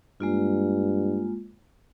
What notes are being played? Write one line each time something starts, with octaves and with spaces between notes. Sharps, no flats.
G2 G#3 A#3 F4